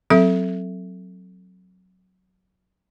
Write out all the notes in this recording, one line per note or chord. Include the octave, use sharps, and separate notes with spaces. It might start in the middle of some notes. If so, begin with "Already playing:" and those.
F#3 C4 A4 E5